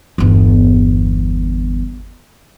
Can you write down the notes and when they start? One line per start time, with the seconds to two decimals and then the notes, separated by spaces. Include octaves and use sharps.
0.18 G1 E2